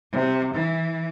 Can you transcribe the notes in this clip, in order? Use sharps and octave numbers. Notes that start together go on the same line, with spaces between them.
C3
E3